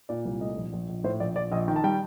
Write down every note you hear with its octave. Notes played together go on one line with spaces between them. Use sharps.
A#2 D5
C2
A3 D#5
A#1
A#1
A#1
A2 C5
A#1 D5
A#1 D5
A#1 D#5
D#3 G5
A5
G3 G5